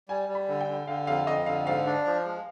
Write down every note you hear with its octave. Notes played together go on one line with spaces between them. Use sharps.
G3 G#5
G3
B5
D3
G5
D3
D3 F5
F2 F5
F2 D#5
D3 F5
G#2 F5
D4
F3
G#3